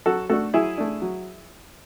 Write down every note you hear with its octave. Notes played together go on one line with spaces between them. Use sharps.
F#3 F#4 A4
A3 D4 F#4 A4
F#3 E4 G#4
A3 D4
F#3